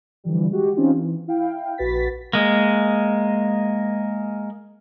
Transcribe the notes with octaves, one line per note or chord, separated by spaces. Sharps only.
D3 E3 F3 G3
G#3 F#4 G4
E3 C4 C#4 D#4 F4 G4
E3
E4 F5 G5
A#1 F#4 B4 A6 B6
G#3 A#3